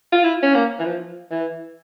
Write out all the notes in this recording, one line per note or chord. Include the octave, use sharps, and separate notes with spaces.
F4
E4
C#4
A#3
E3
F3
E3